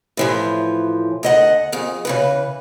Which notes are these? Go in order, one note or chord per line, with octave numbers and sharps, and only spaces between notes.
A2 E3 F3
D2 D#5 F#5
F2 G#4
C#3 E3 B4